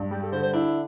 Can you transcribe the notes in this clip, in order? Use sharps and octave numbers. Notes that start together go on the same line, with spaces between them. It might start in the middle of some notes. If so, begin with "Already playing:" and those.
Already playing: G2
G3 G4
A4
D3 C5
C5
D4 E4